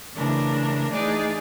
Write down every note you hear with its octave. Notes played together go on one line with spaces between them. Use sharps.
C#3 E3 A3 D4 A#4
E3 A3 D4 D#4 G#4 D5